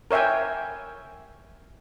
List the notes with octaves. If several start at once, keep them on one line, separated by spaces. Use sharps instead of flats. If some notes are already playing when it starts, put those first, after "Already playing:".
A#4 C#5 E5 G5 G#5